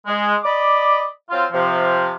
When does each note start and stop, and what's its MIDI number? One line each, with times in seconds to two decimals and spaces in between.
0.07 0.35 56
0.44 1.05 74
0.44 1.05 75
0.44 1.05 83
0.44 1.05 86
1.30 1.45 54
1.30 1.45 60
1.30 1.45 65
1.52 2.15 48
1.52 2.15 53